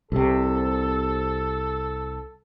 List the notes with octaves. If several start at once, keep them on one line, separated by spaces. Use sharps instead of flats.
C2 C3 A4